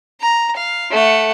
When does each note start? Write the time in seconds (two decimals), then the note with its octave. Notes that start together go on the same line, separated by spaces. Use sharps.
0.21 A#5
0.56 F5
0.91 A3 F#5